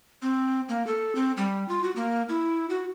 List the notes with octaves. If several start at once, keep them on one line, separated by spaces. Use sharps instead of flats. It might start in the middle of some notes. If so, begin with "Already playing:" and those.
C4
A#3
A4
C4
G3
F4
F#4
A#3
E4
F#4